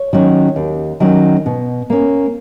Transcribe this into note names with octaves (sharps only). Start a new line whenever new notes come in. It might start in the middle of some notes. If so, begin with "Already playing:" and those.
Already playing: C#5
D#3 F#3 C#4
D#2
D#3 F#3 C#4
B2
A#3 C#4